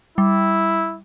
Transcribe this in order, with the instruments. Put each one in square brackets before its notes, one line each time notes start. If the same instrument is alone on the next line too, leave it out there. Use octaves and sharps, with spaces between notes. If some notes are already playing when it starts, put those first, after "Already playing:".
[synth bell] G3 [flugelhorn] E4